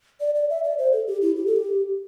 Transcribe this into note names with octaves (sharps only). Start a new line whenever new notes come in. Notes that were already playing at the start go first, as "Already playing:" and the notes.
D5
D5
E5
D5
C5
A4
G4
E4
G4
A4
G4